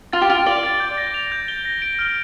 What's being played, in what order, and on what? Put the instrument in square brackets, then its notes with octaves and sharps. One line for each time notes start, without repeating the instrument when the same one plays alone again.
[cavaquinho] F4 [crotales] A6
[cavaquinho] G4
[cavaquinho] F4 [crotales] D7
[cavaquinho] D5 [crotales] G7
[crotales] A6
G6
A#6
F7
G6
G7
A#6
D7
F6